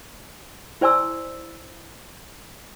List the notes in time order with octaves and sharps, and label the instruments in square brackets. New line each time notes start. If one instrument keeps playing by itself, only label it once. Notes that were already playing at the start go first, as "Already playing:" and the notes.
[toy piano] E4 C5 D5 G#5 C6 E6